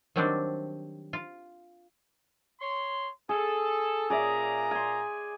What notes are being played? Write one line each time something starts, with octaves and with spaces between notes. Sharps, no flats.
D#3 F#3 G3 C4 D4
F4
C#5 C6
G#4 A4
A#2 G#4 D5 E5 A#5
G#5 C6